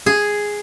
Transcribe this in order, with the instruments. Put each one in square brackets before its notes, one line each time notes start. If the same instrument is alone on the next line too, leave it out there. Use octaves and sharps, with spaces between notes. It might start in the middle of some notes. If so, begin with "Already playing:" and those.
[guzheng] G#4